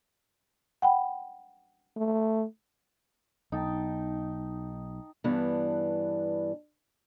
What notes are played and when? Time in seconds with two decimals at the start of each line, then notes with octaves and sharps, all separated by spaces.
0.82 F#5 G5 B5
1.96 A3
3.52 B1 D#4 G5 A5
5.24 G2 E3 B3 D4